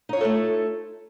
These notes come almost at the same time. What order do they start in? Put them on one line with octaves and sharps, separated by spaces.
D#4 C#5 F4 A4 A3